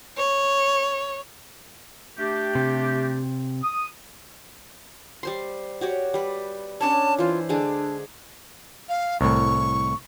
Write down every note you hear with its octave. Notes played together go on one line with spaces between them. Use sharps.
C#5
A3 D4 G4
C3
D#6
G3 C5 C6
F#4 G4 C#5
G3 B4
C#4 D4 C#5 A5
E3 F4 C5
D3 G#3 D4 G#4
F5
C2 A2 C#6